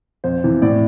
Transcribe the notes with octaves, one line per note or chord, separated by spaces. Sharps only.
F2 C5
C3 E3
A2 D5